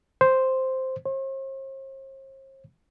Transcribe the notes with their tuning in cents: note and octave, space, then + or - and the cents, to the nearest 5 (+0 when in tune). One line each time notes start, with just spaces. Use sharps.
C5 +0
C5 +45